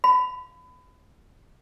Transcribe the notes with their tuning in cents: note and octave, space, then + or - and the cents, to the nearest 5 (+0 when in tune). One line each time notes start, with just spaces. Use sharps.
F5 +0 B5 +25